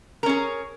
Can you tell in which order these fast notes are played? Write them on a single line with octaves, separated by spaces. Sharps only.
A#4 C#4 G#4